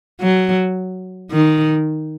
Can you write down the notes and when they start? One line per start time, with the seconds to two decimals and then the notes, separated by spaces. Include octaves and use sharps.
0.21 F#3
1.31 D#3